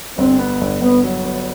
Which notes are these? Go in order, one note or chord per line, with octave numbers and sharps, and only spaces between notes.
G1 C4
B3
G1
G1 B3
F#3
B3